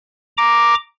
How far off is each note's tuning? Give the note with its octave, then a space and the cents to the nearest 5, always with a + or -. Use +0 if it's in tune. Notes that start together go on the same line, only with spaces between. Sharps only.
A#5 +0 D6 +0